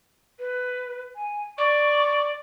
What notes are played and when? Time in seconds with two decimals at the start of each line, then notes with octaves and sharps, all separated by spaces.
0.39 B4
1.15 G#5
1.58 D5 C#6